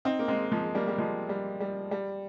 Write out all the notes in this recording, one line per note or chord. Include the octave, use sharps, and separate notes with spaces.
C4 D#4
A#3
G#3 C4
F3 G#3
G3 A#3
G3
F3 G#3
G3
G3
G3